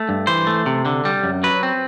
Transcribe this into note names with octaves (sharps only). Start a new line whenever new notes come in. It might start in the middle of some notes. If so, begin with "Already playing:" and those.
Already playing: A3
G2
E3 C5
A3
C3
D3
G3
F#2
F#3 B4
C4